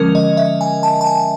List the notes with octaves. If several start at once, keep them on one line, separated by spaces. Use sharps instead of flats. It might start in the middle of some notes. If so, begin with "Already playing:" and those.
Already playing: D3 F3 G#3 C#4 A#4
D#5
E5
G#5
A5
A5
G#5